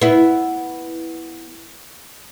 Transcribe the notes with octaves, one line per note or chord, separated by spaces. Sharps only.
B3 E4